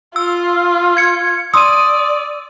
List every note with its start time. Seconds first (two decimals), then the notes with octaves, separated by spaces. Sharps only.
0.16 F4 E6
0.97 G#6 C#7
1.54 D5 C6 D#6 E6 D#7